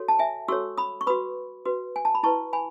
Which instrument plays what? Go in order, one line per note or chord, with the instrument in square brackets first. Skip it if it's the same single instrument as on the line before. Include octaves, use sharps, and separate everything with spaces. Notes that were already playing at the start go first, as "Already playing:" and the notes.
Already playing: [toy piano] F#4 A4 C#5
A5
E5 G#5
F#4 A4 C#5 C#6 E6
B5 D#6
C#6
F#4 B4 B5 D#6
F#4 B4
G#5
A5
B5
E4 B4 A5 C#6
G#5 B5